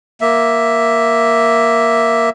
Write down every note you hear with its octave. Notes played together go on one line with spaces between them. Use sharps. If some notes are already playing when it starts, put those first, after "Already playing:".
A#3 E5